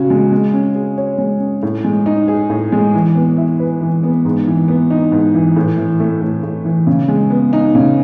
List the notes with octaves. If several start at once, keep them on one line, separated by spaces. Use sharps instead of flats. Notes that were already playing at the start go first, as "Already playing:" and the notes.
Already playing: C#3 C#4 F#4
G#3
G#3
C#4
G#4
C#5
G#3
C#4
A2
G#3
D#4
G#4
A2
G#3
E3
B3
E4
B4
E3
B3
G#2
E3
B3
D#4
G#2
E3
A2
E3
A3
A2
A2
E3
C#3
G#3
B3
D#4
C#3